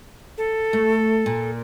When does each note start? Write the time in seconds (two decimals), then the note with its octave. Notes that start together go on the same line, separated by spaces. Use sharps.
0.38 A4
0.73 A3
1.26 A#2